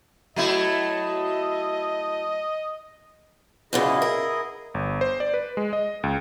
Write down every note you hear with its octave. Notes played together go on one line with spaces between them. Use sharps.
F#3 A3 E4 D#5
F#2 A#2 C#3 E4 G#4 D#5
A#4
G1
C5
D5
B4
G#3
D#5
C#2